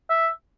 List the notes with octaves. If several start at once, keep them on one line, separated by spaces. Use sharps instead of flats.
E5